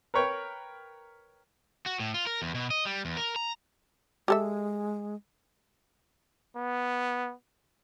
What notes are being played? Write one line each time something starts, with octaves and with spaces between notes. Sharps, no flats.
A#4 B4 C#5 G5
F#4
A2
F4
A#4
E2
B2
D#5
G3
E2
A#4
A#5
G#3 G4 A4 E5
B3